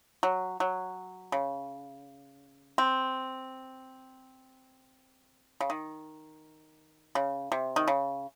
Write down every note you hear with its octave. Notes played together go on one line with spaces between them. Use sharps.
F#3
F#3
C#3
C4
C#3
D#3
C#3
C3
D#3
C#3